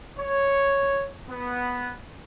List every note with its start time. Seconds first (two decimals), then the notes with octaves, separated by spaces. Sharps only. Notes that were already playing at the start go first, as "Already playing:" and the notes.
0.19 C#5
1.29 B3